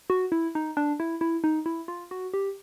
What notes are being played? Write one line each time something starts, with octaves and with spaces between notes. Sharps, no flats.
F#4
E4
D#4
D4
E4
E4
D#4
E4
F4
F#4
G4